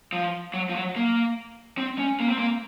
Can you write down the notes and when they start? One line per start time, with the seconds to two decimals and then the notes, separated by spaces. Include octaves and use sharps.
0.13 F3
0.54 F#3
0.69 F3
0.75 F#3
0.96 A#3
1.78 C4
1.98 C#4
2.20 A#3
2.29 C4
2.38 A#3